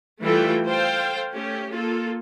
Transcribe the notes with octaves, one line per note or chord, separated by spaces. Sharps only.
E3 G3 A3 F4 A4 G5
A4 C5 F5 G5
A3 C#4 G4
A#3 F4 A4